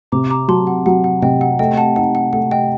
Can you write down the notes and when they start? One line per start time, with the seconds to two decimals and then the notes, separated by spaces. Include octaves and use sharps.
0.12 C3 A#5 D6
0.30 A#5 D6
0.48 F#3 A5 C6
0.67 F#5
0.86 F#3 F#5
1.04 F#5
1.22 C3 D#5 G5
1.41 F#5
1.59 A3 D#5 G5
1.77 F#5 A5
1.96 D#4 F#5
2.15 F#5
2.33 A3 F#5
2.51 D#5 G5